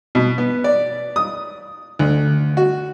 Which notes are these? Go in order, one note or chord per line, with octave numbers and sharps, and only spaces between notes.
B2
B3
D5
D#6
D2
F#4